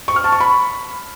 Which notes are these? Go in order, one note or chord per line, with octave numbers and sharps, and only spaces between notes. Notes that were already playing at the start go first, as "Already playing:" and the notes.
C#6
F6
A5
C#6
B5